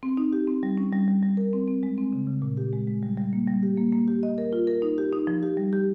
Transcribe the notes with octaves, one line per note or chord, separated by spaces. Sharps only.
C4
D#4
G4
C4
G3
C#4
G3
G3
G3
A#4
C4
C4
G#3
C4
C#3
C#3
A#2
G4
G#3
G#3
G3
G3
A#3
G3
G4
A#3
A#3
G4
D#5
A#4
F4
A#4
D#4
G4
D#4
F3
G4
G3
G4